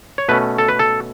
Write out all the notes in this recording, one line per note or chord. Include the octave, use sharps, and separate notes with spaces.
C#5
B2 A3 C#4 B4
A4
B4
A4